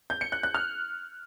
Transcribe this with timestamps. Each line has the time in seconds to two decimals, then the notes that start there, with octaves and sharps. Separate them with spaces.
0.10 G6
0.21 C#7
0.32 F#6
0.43 F#6
0.55 F6